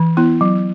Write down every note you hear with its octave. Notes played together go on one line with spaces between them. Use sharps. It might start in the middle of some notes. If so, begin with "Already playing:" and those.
Already playing: E3
B3 E4
F#3